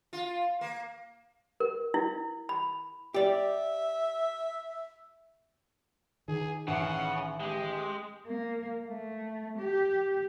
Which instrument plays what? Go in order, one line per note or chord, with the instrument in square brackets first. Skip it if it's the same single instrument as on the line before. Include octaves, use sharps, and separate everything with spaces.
[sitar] F4
A#3
[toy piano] A#4
E4
B5
[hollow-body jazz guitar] G4 D5 [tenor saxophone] E5
[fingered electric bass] D#3 [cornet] G#4
[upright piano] A1 [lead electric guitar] C#3 [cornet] F#5
[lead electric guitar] G#3 [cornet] G4
[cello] A#3
A3
G4